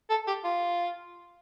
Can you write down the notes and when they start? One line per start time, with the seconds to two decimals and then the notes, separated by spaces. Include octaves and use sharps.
0.10 A4
0.27 G4
0.44 F4